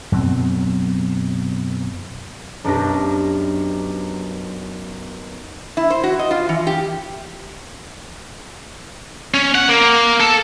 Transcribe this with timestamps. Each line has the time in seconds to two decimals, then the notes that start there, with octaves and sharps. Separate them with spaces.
0.12 F#2 B2 F#3 C4
2.64 B1 F#2 D4 G4 A#6
5.77 E4
5.90 C5
6.03 F#4
6.19 D#5
6.31 F4
6.49 E3
6.67 G4
9.34 C#4
9.55 F#5
9.69 A#3
10.20 A4